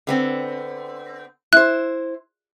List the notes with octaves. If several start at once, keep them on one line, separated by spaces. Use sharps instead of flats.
D3 B3 C4
E4 C5 F#6